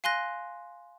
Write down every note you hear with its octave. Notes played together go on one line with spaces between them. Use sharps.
F5 G#5 C6 F#6 A#6